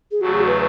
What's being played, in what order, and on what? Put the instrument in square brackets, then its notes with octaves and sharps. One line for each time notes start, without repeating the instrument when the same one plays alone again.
[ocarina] G#4
[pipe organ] E2 C#3 F#3 A3 [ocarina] F#4
[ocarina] G#4
B4